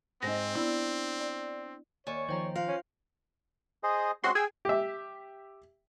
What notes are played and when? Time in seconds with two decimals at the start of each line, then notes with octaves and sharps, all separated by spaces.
0.23 G#2 C4 D#4 A#6
0.55 B3 D4 E4
1.20 D5
2.07 D#2 C#5 D5 G#5 C#6
2.29 D#3 F3 C5 G5 A#5
2.56 F4 C5 F5
2.68 C#4
3.83 G#4 C5 D#5
4.24 G#3 C4 C#4 F#4 C6
4.35 G#4 G5 G#5 E6
4.65 G4 E5